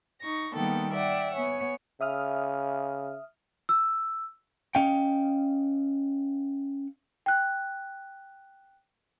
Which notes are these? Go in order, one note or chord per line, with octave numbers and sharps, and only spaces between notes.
D#4 C#6 A#6
D#3 G3 A#3 B3 A4 G5
D5 E5 F#5 G5
B3 C#5 G#5
C#3 E5 D#6 F6
E6
C#4 D#5 F5 G5
G5 F#6